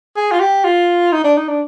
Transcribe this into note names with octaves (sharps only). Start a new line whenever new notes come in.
G#4
F4
G4
F4
D#4
D4
D#4
D4